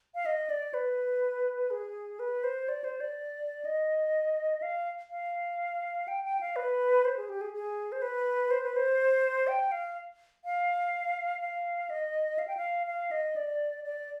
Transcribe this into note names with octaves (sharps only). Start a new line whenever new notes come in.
F5
D#5
D5
B4
G#4
B4
C5
D5
C5
D5
D#5
F5
F5
G5
G5
F5
B4
C5
G#4
G4
G#4
G#4
C5
B4
C5
B4
C5
G5
F5
F5
F5
D#5
F5
G5
F5
F5
D#5
D5
D5